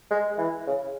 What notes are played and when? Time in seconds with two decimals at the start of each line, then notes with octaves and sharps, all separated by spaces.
0.11 G#3
0.38 E3
0.67 C#3